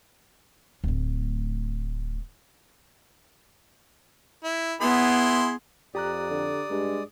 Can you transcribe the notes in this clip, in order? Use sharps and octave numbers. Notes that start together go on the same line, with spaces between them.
D1 A2
E4
B3 E4 G#4 C6
F2 G4 D5 A#5 D#6 F#6
D3
G2 G#3